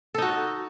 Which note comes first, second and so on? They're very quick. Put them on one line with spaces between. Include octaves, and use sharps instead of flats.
A4 D#4 F#4